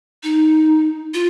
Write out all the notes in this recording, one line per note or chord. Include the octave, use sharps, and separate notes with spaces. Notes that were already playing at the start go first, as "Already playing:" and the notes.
D#4
F4